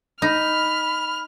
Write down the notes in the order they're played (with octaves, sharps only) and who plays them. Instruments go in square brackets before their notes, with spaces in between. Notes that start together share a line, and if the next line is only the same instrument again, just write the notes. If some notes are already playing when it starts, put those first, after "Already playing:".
[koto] D#4 [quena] B5 [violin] F6